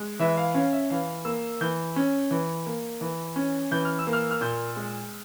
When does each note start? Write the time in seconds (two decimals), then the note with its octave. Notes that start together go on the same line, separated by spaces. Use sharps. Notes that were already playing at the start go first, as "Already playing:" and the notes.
Already playing: G#3
0.20 E3 E5
0.37 F5
0.55 C#4 F5
0.73 E5
0.90 E3 F5
1.25 A#3 E6
1.61 E3 G6
1.96 C#4
2.31 E3
2.66 A#3
3.01 E3
3.36 C#4
3.71 E3 G6
3.85 F6
3.99 E6
4.07 A#3
4.13 F6
4.31 F6
4.41 A#2 G6
4.76 G#3